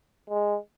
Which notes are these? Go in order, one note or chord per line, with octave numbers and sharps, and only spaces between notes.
G#3